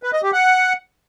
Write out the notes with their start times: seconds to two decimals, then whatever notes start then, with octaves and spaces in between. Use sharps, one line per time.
0.03 B4
0.13 D#5
0.23 G4
0.33 F#5